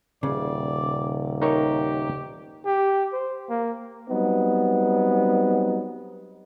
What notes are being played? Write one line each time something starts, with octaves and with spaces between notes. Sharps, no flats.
D#1 C#3 D5
D#4 G4 A#4 C#5
G4
C5
A#3
F#3 G3 B3 C4 D#4